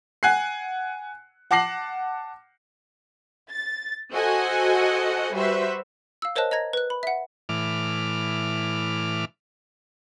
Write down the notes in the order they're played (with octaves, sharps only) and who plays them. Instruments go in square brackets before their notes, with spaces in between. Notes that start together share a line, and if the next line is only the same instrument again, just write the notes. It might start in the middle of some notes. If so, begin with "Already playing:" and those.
[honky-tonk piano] F#5 G#5 F#6 C7
F#5 A5 D6 A#6 C7 F#7
[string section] A6
F#4 A4 C5 D#5 F#5 G#5
G3 F#4 B4 C5 E5
[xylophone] F5 E6
A#4 C5 C#5 D#5 A5 F#6
D#5 A#5 G#6 A#6
B4 F#6
B5
E5 F#5
[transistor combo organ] A2 E3 D6 F6